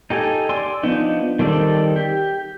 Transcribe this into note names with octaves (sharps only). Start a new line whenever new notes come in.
D#4 G4 A4 G#5
D5 G#5 C6 E6
F3 B3 D4 D#4
D#3 G3 C4 A4 D5
G4